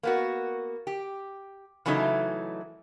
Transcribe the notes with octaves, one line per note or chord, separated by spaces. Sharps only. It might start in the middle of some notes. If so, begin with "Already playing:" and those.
A#3 B3 F#4
G4
C#3 E3 F#3 A3 D#4